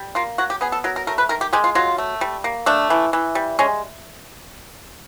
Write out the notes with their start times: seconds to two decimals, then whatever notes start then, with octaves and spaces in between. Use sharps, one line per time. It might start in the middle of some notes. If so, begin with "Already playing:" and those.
Already playing: G3
0.15 A#3 F4
0.38 F#3 F#4
0.50 G4
0.61 B3 G#4
0.72 A4
0.84 F#3 A#4
0.96 A#4
1.07 A3 A#4
1.18 B4
1.29 D#3 A#4
1.41 G4
1.53 G#3 G4
1.64 F4
1.75 F#3 F4
1.98 A3
2.21 G3
2.44 A#3
2.66 A3 D4
2.90 E3
3.13 E3
3.35 G3
3.59 G#3 C#4